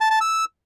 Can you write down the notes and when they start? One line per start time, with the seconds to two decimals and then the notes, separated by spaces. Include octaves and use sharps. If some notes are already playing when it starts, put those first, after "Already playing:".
0.01 A5
0.11 A5
0.21 E6